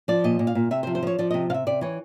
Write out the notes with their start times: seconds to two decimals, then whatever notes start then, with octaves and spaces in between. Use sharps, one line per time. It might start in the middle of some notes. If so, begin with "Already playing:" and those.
0.08 F3 D5
0.24 A#2 D#5
0.39 A#2
0.47 F5
0.55 A#2
0.71 C3 E5
0.83 C5
0.87 F3
0.95 C5
1.03 F3 C#5
1.19 F3 D5
1.31 C3 D#5
1.50 C3 F5
1.54 E5
1.67 C3 D5
1.81 E3 C#5